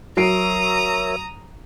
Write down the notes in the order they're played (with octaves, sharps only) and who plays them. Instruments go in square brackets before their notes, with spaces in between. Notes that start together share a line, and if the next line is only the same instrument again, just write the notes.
[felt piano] F#3 C7 D7 [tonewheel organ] A#4 C#5 E5 [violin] A#5 D#6